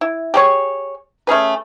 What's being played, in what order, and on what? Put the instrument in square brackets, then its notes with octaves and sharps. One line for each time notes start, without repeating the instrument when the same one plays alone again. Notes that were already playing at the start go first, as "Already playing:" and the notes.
[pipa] E4
G4 G#4 C#5
A3 C#4 G#4 B4